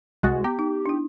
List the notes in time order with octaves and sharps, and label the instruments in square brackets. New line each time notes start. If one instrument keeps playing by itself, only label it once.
[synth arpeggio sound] C2 G#3 F#4 [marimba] F#6 A6
[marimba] B3 [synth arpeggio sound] G4
[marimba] D#4
D4 E4